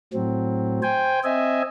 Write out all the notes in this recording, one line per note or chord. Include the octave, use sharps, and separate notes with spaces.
A2 F#3 C4
C5 G5 G#5
C4 D#5 E5 G#5